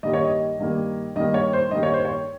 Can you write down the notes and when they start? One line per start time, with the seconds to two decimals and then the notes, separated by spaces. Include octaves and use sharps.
0.03 G2 D#3 G3 A#3 D#5
0.13 C#5
0.25 D#5
0.59 G2 D#3 G3 A#3
1.16 G2 D#3 G3 A#3 D#5
1.34 C#5
1.53 C5
1.71 G2 D#3 G3 A#3 D#5
1.83 C#5
1.94 C5
2.05 C#5